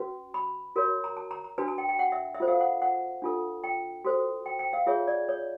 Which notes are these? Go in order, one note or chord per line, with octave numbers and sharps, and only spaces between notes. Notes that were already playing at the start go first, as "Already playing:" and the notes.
Already playing: C#4 F#4 B4
B5
F#4 A#4 C#5
A#5
A5
A#5
A#5
D4 F#4 B4 A5
A5
G5
G5
F#5
E5
E5
F4 A4 C5
F5
F#5
F#5
D4 F4 A4
G5
F#4 A4 C5
G5
G5
F5
F4 G#4 C#5 E5
D5
C#5